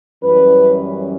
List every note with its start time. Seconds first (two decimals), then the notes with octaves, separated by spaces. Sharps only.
0.22 F#2 E3 G3 C#4 B4